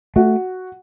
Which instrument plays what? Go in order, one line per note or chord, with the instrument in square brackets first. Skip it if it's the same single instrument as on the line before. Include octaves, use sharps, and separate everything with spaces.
[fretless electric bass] A3 [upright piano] F#4